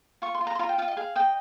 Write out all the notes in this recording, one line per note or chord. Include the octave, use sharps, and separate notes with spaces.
F4 C#6
C6
F4
A#5
C6
F4 A#5
G5
F4 F5
D#5
G#4 F5
D#5 G5